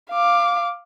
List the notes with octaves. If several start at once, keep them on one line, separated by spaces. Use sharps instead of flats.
F5 D6